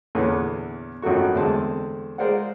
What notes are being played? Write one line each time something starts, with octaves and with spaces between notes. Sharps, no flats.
E2 A#2 D3 E3 B3 C#4
G#1 F#2 F#3 A3 F#4 C#6
E2 D3 G#3 A3 C4 A5
G#3 A#4 C5 D5 F5 F#5